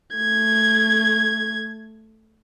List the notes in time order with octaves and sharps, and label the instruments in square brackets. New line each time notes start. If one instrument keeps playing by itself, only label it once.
[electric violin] A3 G#6